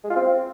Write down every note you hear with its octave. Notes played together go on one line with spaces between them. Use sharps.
G#3
F4
C4